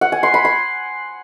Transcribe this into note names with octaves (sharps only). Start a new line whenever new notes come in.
F#5
G#5
C6
B5
C6